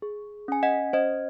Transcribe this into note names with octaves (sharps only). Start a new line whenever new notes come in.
G#4
C#4 G#5
D#5 F#5
C#4 C5 D#5